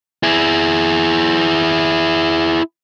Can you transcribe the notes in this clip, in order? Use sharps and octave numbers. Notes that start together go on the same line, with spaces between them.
E4 G#4